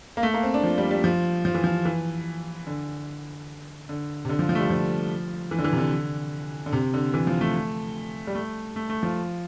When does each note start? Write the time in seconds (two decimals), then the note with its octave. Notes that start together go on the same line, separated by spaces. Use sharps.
0.17 A#3
0.23 A3
0.34 A#3
0.43 C4
0.54 D4
0.64 F3
0.78 G3
0.91 G3
1.04 F3
1.45 F3
1.55 E3
1.64 F3
1.85 E3
2.67 D3
3.89 D3
4.25 C3
4.29 D3
4.39 F3
4.49 F3
4.55 A3
4.59 G3
4.70 F3
5.51 E3
5.59 D3
5.64 E3
5.73 C3
5.78 D3
6.66 D3
6.73 C3
6.94 D3
7.14 E3
7.27 F3
7.41 A3
8.27 G3
8.35 A3
8.76 A3
8.90 A3
9.03 F3